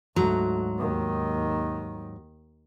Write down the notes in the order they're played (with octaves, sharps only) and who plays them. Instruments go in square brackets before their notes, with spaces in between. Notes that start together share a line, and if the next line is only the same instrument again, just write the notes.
[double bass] D2 [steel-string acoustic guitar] G#2 F#3 A#5
[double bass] D#2 D#3